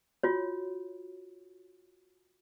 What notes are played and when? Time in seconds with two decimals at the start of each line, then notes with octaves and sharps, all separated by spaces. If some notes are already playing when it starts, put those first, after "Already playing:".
0.23 F4 F#4 C#5